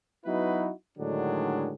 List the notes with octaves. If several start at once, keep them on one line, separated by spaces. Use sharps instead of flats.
F#3 B3 D#4 E4 F#4 B4
A2 D3 D#3 F#3 G#3 D4